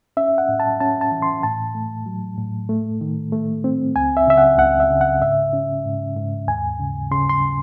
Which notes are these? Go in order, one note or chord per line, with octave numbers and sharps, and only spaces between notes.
C#4 E5
F#5
A2
A5
C#4 A5
A5
E3
C6
A2 A5
A3
F#3
A2
A3
D#3
A3
C4
C#2 G#5
E5
C#3 E5
F#5
C#2 F#5
E5
C#3
F#5
G#2 E5
C#4
G#2
G#2
D#2 G#5
C#3
C#3 C6
C6